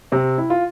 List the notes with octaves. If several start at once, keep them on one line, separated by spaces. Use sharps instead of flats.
C3 C4
E4
F4